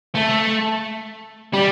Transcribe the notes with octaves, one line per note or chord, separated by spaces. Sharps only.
A3
G3